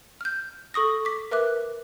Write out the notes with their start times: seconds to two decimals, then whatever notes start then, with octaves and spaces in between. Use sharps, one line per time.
0.21 F6 G6
0.74 A4 C#6 D#6 A#6
1.05 D6 B6
1.31 A#4 B4 E5 D6 F#6